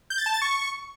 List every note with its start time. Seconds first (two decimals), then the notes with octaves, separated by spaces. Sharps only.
0.10 G6
0.18 A6
0.26 A5
0.34 A6
0.42 C#6